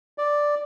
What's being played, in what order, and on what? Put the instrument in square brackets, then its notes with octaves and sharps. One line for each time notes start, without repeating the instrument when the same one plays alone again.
[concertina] D5